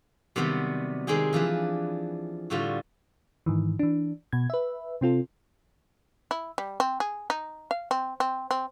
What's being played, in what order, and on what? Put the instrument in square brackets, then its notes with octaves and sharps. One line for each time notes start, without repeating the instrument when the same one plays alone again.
[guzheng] C3 D#3 F#3 G3 B3
D#3 G#3 C4 D#4 G4 G#4
E3 F3 D4 B4
A2 D3 G3 F4 F#4
[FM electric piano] G#2 D#3 E3
E3 D4
B2 G#6
B4 E5
C3 C4 F4 A4
[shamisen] E4
G3
C4
G#4
D#4
F5
C4
C4
C4